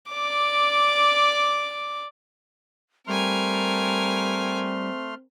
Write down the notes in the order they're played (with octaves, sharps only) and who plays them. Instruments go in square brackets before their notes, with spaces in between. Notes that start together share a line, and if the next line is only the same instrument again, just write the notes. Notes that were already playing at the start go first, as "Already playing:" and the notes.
[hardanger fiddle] D5 D6
[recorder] G3 [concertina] A3 C6 F6 [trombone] C4 [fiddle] A#4 G#5